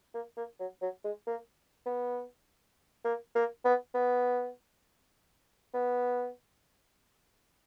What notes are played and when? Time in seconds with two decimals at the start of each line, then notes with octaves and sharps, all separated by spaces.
0.14 A#3
0.37 A#3
0.60 F#3
0.82 F#3
1.04 G#3
1.27 A#3
1.86 B3
3.05 A#3
3.35 A#3
3.65 B3
3.94 B3
5.74 B3